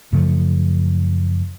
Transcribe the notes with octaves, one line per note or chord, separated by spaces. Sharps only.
F#2 C#3 F3 A3